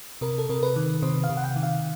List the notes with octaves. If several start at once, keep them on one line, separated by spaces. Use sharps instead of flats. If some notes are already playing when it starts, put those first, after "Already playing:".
C3 A#4
A4
C3 A#4
B4
D#3
C3 C5
F5
C3
F#5
G5
D#3
F5